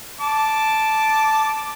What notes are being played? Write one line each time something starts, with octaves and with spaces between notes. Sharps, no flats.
A5 D6